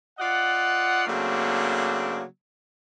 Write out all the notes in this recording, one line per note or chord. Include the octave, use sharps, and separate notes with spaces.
F4 D5 D#5 F#5
C#3 F#3 A3 A#3 C4 D4